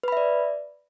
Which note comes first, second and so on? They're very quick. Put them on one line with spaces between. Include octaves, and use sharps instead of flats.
B4 B5 E5 D5